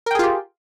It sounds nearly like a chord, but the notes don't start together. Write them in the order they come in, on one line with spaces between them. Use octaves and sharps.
A#4 G5 G#4 F4 G4